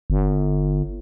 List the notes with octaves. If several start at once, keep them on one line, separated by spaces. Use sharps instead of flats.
G1